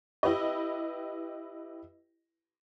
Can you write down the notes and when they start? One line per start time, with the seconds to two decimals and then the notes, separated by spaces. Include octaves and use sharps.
0.23 E4 G4 B4 D#5